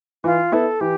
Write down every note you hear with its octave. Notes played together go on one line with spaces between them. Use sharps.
E3 F4
B3 E4 A4
E3 G4